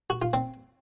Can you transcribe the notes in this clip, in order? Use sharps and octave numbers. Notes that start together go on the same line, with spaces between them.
F#4
F4
C4